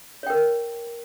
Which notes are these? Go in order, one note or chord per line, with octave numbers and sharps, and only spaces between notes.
A#4 C#5 G5